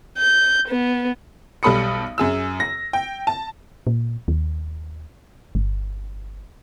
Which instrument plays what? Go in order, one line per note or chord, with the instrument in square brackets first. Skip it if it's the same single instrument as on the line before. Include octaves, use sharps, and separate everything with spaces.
[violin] G6
B3
[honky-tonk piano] B1 G3 A4 B5 D#6 C#7
F#2 G#4 E6
A#6
G5
A5
[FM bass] A#2
D#2
G1